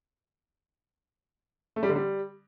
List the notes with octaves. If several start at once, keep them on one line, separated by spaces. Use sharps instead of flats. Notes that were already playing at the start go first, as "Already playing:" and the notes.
A3
G3
D3
G3